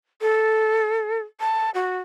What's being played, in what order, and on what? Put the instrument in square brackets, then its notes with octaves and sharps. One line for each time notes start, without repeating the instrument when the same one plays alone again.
[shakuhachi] A4
A5
F#4